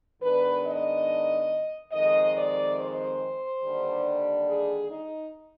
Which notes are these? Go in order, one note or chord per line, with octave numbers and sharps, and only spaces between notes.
G#2 D#3 B3 D4 B4
D#5
F2 D#3 G#3 C4 D#5
D5
C5
D#2 D3 G3 D4
G#4
D#4